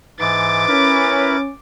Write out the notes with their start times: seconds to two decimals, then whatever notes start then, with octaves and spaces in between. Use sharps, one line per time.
0.20 G#2 E3 D6 A6
0.69 C#4 E4 A#4 B4